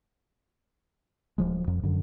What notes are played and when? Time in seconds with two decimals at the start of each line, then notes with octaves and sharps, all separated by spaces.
1.38 D1 F3 G#3
1.67 F2
1.83 F#2 D3